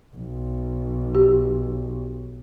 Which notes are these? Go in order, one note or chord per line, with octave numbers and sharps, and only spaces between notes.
B1
G4